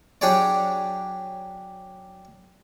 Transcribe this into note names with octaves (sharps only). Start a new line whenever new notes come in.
F#3 D4 G4 G#4 C#5 D5